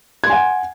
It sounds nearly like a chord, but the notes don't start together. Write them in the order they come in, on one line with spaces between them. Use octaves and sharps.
G#6 C6 G#5 F#5